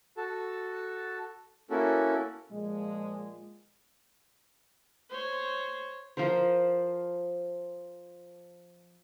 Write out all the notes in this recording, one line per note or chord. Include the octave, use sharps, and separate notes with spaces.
F#4 A4 A5
A#3 C#4 E4 F#4 A4
A#2 F3 G#3
C5 C#5
F3 F4 A#4 C5